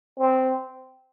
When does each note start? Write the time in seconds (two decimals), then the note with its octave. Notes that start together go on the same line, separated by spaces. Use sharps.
0.19 C4